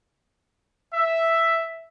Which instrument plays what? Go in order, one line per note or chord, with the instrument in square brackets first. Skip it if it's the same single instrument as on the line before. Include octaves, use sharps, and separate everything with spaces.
[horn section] E5